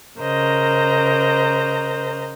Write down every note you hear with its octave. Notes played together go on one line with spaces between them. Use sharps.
C#3 A#4 C5 D#5 A#5